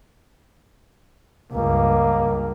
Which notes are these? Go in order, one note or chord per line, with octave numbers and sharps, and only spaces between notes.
C#2 G2 A#3